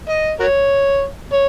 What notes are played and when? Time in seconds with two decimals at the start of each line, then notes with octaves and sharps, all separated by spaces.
0.09 D#5
0.40 F#4 A#4 C#5
1.33 C#5